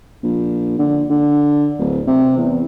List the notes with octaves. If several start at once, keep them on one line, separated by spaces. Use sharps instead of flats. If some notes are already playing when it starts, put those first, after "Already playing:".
A#1
D3
D3
D1
C3
E2